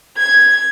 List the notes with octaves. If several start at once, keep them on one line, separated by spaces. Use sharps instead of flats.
G#6